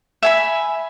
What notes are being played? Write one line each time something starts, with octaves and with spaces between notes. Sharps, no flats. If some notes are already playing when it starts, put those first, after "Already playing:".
E5 G#5 B5